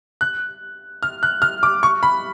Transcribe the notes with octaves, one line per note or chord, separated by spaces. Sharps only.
F#6
F6
F#6
F6
D6
C#6
B5